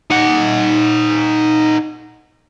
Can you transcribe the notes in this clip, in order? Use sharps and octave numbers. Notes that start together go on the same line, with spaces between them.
D#4 F#5